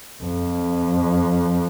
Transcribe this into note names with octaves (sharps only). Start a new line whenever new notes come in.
F2